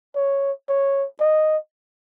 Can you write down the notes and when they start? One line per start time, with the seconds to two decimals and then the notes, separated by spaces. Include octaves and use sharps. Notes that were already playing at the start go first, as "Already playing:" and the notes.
0.16 C#5
0.69 C#5
1.21 D#5